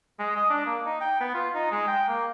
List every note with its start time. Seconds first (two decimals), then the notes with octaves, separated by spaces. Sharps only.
0.19 G#3
0.37 D#5
0.50 D4
0.66 A#3
0.86 D#4
1.01 G5
1.21 B3
1.34 F4
1.55 D#4
1.72 G#3
1.88 G5
2.09 A#3